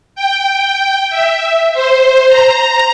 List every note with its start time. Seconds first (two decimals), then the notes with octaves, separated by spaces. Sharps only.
0.15 G5
1.10 E5
1.74 C5
2.28 A#5